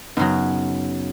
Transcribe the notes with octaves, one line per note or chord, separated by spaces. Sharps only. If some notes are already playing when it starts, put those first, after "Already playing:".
F#2 C#3 F#3 B3 D#4